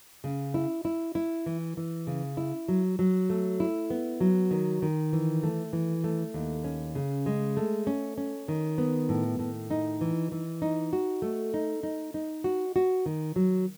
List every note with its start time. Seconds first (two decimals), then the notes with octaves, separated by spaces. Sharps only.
0.24 C#3
0.54 E4
0.85 E4
1.15 E4
1.46 E3
1.77 E3
2.07 C#3
2.37 E4
2.68 F#3
2.99 F#3
3.30 A3
3.60 E4
3.90 B3
4.21 F#3
4.51 D#3
4.82 D#3
5.13 E3
5.43 A3
5.73 E3
6.04 A3
6.34 D#2
6.64 C#4
6.95 C#3
7.26 G#3
7.57 A3
7.87 C#4
8.18 C#4
8.48 D#3
8.78 B3
9.09 A2
9.39 A2
9.71 D#4
10.01 E3
10.32 E3
10.62 D#4
10.93 F#4
11.22 A3
11.54 D#4
11.83 D#4
12.14 D#4
12.44 F#4
12.76 F#4
13.06 D#3
13.36 F#3